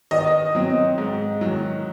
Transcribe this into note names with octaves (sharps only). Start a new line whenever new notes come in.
D#3 D#5
F#3 C4
G#2
D#3 F#3